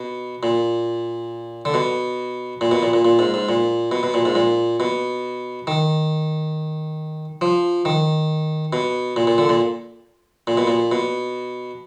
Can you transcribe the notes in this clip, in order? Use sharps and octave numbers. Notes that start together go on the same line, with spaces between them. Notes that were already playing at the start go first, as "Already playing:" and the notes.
Already playing: B2
A#2
D3
B2
A#2
B2
A#2
A#2
A#2
G#2
G#2
A#2
B2
B2
A#2
G#2
A#2
B2
D#3
F3
D#3
B2
A#2
A#2
D3
A#2
A#2
B2
A#2
B2